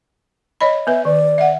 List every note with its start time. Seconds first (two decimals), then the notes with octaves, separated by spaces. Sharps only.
0.61 C#5 D#5 B5
0.87 B3 B4 E5
1.05 D#3 D5
1.38 E5 F#5